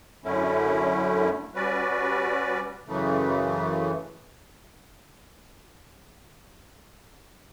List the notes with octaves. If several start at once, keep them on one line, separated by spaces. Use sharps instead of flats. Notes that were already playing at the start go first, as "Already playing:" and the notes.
F#2 D3 A3 C#4 E4
G3 C#4 F#4 B4 D5
F#2 C#3 E3 A3